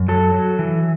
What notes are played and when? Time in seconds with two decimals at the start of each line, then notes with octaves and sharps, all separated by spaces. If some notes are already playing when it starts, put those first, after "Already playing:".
Already playing: F#2
0.08 F#3 A4
0.34 F#3
0.59 E3